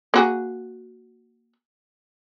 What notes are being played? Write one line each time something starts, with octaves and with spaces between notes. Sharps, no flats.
A#3 F#4 G#4